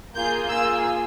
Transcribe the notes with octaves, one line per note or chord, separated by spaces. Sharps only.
A#3 F4 G#4 G6
A#3 F4 G#4 E6